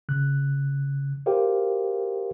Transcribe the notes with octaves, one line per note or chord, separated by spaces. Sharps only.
C#3 F#6
F#4 G4 A#4 C5 F5 G5